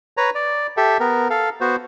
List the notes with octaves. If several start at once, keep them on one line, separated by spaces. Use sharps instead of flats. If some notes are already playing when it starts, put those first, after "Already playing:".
B4 C#5 A#5
D5
G4 A4 E5
B3 A#4
A4 F5
B3 F#4 C5